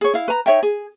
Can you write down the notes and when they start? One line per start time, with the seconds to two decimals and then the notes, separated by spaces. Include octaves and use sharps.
0.01 G#4 C#5
0.14 E4 F5
0.28 B4 A#5
0.46 D#4 C#5 E5 G5
0.63 G#4